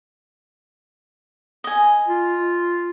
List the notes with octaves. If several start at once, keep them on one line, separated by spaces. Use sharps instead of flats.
D#5 G#5
F4